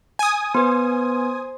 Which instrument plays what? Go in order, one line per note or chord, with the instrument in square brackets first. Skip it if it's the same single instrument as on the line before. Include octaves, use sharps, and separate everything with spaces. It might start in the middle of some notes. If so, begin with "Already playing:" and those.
[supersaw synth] G#5 D#6
[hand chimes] B3 B4 [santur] C5